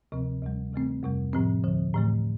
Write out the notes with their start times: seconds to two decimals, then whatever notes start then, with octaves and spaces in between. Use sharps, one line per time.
0.12 D2 C3 F3 C4
0.42 D2 C3 G3
0.73 C3 E3 A3 C4
1.03 F2 C3 G3
1.33 A2 F3 C4
1.64 D2 D3 F3
1.94 A2 E3 A3